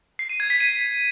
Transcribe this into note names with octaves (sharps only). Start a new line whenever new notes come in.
C7
D#7
G#6
B6
D#7